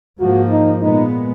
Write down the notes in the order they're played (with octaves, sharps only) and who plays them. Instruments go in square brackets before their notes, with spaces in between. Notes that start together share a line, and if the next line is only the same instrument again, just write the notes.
[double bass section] G#2 F3 A#3 [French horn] F#4
[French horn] D#4
[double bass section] A#2 G#3 B3 [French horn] D#4